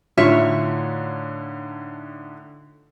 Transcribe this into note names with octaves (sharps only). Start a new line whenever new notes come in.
A2 D3 D#4 F4 C#5 E5